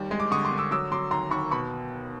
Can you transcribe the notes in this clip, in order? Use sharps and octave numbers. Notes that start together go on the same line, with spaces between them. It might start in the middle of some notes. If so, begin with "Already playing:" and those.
Already playing: D#2 G3
G#3
D6
D3 C#6 D#6
C6 D6
D3
D6 E6
F#3 D6 E6
F#3 C6 D6
D#2 A#5 C6
D#2 B5 C#6
B2 B5 C#6